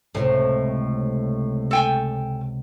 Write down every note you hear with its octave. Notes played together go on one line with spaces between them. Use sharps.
C#2 A2 C3
A4 G5 G#5